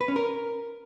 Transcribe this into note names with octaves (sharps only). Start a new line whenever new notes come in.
B4
C#4
A#4